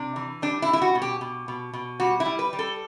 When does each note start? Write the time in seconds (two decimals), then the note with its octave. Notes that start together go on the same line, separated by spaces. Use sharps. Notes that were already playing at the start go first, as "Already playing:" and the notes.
Already playing: C3 D4
0.16 E3
0.42 G3 D4
0.62 E4
0.68 G3
0.73 E4
0.82 F#4
0.95 B2
1.02 G4
1.21 B2
1.48 B2
1.73 B2
2.00 G3 F#4
2.20 E4
2.25 G3
2.39 B4
2.53 G3
2.59 A4